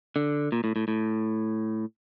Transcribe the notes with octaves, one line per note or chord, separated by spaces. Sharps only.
D3
A#2
A2
A2
A2